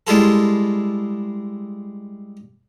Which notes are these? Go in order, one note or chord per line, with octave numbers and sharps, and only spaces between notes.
G3 G#3 E4 F4 G#4 A4